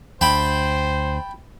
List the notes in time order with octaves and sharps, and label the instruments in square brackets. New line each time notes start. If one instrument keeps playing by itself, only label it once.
[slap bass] D2 [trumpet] C5 [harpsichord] G5 A5 B5